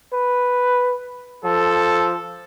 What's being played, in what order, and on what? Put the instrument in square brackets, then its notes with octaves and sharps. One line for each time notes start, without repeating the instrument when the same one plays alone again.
[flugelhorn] B4
[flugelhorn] F3 [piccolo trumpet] A4